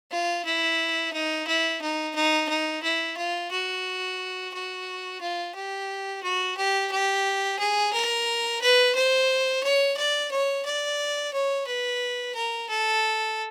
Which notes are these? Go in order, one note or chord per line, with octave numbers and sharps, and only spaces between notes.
F4
E4
D#4
E4
D#4
D#4
D#4
E4
F4
F#4
F#4
F4
G4
F#4
G4
G4
G#4
A#4
B4
C5
C#5
D5
C#5
D5
C#5
B4
A#4
A4